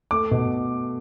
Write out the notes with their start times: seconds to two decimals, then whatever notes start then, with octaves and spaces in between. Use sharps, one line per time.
0.11 A3 D6
0.31 B2